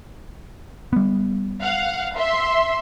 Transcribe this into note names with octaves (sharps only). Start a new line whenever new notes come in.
G3 B3
F5 F#5
E5 C6